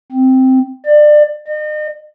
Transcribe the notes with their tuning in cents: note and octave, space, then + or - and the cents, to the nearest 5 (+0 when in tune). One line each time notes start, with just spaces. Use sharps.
C4 -5
D5 +25
D#5 -40